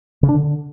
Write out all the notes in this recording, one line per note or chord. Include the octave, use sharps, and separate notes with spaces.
C#3
D4
D3